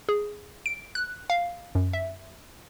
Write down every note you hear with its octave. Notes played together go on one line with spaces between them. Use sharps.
G#4
D7
F#6
F5
F#2
E5